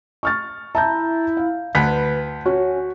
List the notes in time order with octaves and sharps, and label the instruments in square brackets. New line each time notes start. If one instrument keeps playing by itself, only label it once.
[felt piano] C#6 F6 A6
[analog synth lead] E4 [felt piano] A5 A#5 G6
[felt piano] F5
[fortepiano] D2 [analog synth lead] B4 [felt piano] B6
[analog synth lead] C#4 [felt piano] F#4